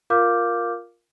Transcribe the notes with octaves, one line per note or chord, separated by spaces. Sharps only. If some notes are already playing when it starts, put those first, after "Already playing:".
F4 A#4 F5 D6 F6 G6